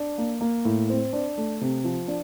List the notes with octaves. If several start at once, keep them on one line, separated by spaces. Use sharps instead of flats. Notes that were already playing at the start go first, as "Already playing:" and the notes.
Already playing: D4
A#3
A#3
A2
C4
D4
A3
C3
F3
D4